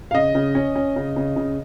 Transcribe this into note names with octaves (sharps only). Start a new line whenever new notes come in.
F5
C#3 D#5
C#3
C#4
C#4
C#3
C#3
C#3